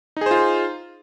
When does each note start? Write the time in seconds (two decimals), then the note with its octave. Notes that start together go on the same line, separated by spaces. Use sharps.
0.17 D#4
0.21 G#4
0.26 C5
0.31 F4